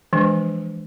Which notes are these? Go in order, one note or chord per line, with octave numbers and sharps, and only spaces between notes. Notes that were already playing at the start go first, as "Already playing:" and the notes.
E3 F3 G#3 D4